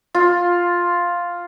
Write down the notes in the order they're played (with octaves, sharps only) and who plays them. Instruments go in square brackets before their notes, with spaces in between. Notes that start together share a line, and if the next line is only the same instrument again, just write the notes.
[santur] F4